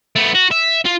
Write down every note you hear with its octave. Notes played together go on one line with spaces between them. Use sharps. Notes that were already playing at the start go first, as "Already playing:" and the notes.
A3 B3
F#4
E5
F4